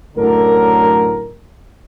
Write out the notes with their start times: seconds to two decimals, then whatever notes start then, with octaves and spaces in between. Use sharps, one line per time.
0.16 F#2 A2 D3 A#4